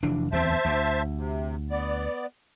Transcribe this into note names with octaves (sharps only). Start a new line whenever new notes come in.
F1 E3 D4
D1 E2 C4 C5 E5 A5
D2
C3
B3 D5